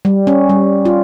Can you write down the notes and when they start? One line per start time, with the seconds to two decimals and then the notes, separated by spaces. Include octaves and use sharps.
0.05 G3
0.27 C#4
0.49 G3
0.85 F4